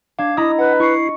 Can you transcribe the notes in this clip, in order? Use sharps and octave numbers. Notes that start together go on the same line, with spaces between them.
D4 F5 G#6
E4 D#5 A#5 D#6
B4 F#5
E4 C#6 C7